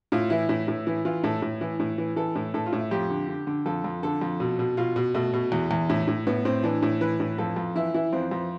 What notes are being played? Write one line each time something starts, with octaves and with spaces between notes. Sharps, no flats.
A2 F4
E3 E4
A2
A2
E3
E3 F4
A2 A4
A2
E3
A2
E3
E3 A4
A2
A2 A4
F4
A2
E4
F2 G4
D3
D3
D3
F2 A4
F2
D3 A4
F2
B2
B2
B2 F4
B2
B2 A3
B2
E2
E2
A2
A2
A2 B3
A2 C4
E3 D4
A2
E3 B4
A2
F2 A4
F2
E3 E4
E3 E4
F2 C4
F2